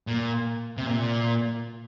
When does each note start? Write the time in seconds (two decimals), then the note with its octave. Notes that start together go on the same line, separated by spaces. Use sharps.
0.07 A#2
0.77 C3
0.86 A#2